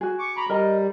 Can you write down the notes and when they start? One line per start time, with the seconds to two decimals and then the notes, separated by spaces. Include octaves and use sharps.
0.01 F#4 G#4
0.19 C#6 D6
0.37 A#5 B5
0.49 G3 A#4 D#5 A#5